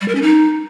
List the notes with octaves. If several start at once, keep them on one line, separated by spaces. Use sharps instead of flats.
G3
A#4
C#4
D#4